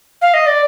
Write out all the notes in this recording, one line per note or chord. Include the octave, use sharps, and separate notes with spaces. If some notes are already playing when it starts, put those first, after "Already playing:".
F5
D#5
D5